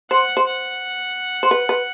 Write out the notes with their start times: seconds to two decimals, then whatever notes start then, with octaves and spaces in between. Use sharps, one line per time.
0.11 C5 F#5
0.37 C5
0.47 F#5
1.43 C5
1.51 B4
1.69 B4